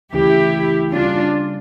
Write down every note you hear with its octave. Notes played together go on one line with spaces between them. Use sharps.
D2 C#3 E3 A3 C#4 E4 G4
C#3 G3 A#3 C#4 D4 F4